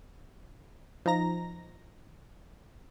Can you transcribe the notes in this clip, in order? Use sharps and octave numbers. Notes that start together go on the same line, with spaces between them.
F3 D#4 A#5 A#6